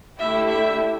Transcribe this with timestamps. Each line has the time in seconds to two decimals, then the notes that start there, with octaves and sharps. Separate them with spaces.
0.19 D3 A3 E4 G4 E5
0.48 E5